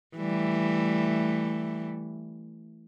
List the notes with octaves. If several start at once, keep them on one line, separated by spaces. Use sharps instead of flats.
E3 G3 A3